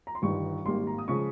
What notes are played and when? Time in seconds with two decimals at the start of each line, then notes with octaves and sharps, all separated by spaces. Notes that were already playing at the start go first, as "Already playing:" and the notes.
0.07 A#5
0.15 C6
0.22 G1 G2 D#3 G3 C#6
0.65 G#1 G#2 G3 A#3 C6
0.87 A#5
0.98 D#6
1.08 C#3 F3 G#3 C#6